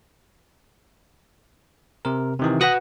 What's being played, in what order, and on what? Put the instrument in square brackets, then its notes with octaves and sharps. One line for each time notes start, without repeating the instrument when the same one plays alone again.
[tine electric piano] C3 A#4
C3 D#3 E3
[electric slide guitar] F#4 B4 F#5 [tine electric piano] D#6 F#6 A#6